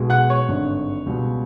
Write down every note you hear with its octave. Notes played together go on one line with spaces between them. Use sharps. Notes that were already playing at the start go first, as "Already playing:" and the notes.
Already playing: B1 B2 G#3
F#5 F#6
C#5 C#6
G#1 G2 D3
C#2 B2 G3